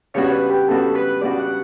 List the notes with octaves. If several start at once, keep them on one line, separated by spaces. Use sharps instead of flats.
C#3 G3 B3 D4 F#4 C#5
B4
G4
C#3 G3 B3 D4 F#4 A4
B4
C#3 G3 B3 D4 F#4 D5
F#5